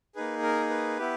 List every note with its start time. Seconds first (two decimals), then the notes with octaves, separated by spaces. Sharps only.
0.15 A#3 D#4 G#4 B4
0.43 A#4
0.70 B4
0.98 B3 E4 G4